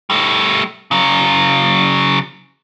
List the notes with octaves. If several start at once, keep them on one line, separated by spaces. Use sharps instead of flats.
G3 A3
C#3 F#3